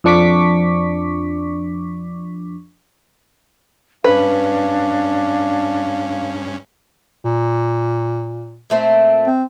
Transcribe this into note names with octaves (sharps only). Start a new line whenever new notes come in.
F2 F3 D4 C#6 D6 B6
G2 C#4 D4 B4 F5
A#2
A#2 A3 C4
C4